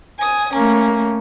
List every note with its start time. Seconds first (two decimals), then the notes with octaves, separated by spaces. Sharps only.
0.19 G#5 D#6
0.54 A3 A#3 C#4